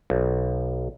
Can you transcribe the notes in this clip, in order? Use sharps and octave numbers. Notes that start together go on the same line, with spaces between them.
B1